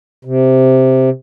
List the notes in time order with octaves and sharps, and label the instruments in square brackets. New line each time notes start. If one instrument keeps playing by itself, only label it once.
[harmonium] C3